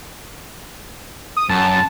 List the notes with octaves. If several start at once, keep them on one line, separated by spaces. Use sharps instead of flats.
D#6
F#2 A5